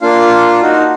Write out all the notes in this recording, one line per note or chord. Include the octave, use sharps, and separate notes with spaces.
A#3 D4 F4 F5
D#4 F#4